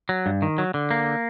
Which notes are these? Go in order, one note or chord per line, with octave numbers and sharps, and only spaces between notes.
F#3
G2
D#3
F#3
D3
A#3